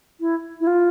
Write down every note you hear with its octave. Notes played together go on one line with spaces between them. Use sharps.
E4
E4
F4